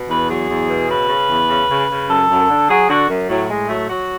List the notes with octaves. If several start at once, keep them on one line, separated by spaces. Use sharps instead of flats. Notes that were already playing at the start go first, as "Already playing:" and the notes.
Already playing: B2
E2 B4
F#3 G#4
E2
B2
C#3 B4
C#3
E2
C#3
C#3
C#3
F#2 A4
F#2
D3
F#3 G#4
D3 F#4
F#2
A2 F#3
A2 G#3
F#3 A3
F#3 F#4